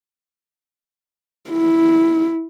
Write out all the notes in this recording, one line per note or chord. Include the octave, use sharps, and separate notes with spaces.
E4